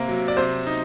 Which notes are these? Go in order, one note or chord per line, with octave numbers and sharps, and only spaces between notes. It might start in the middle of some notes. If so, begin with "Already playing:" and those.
Already playing: C3 A#3 A#4
F#3
D5
C3 C5
D#4